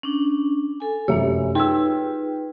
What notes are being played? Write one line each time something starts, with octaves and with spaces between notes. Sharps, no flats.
C#4 D4
A4 G#5
F1 F#2 F3 G4 C#5 E5 G#5
D#4 F4 G#4 B4 G5 E6